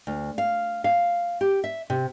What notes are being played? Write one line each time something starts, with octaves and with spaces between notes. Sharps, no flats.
D2
F5
F5
G4
E5
C3